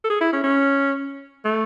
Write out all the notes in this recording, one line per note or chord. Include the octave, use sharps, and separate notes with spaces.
A4
G#4
E4
C#4
C#4
A3